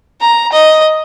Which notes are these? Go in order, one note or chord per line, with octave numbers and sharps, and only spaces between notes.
A#5
D#5